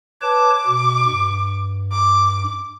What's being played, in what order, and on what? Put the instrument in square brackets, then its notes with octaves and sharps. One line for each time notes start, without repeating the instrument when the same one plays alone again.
[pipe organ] B4 C#5 A5 [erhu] D6
[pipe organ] B2
G2
[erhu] D6